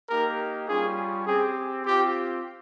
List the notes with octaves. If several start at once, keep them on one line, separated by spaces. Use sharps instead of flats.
A#3 D#4 G4 A#4
G3 C#4 F4 G#4
C4 G4 G#4
C4 F4 G4